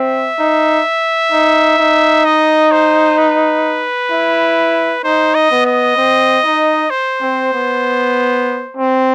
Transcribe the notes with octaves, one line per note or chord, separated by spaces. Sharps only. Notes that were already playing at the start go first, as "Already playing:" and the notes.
Already playing: C4 E5
D#4
D#4
D#4
D#5
C5
B4
E4
D#4 C5
D#5
B3
D#5
C4
D#4
C5
C4
B3
C4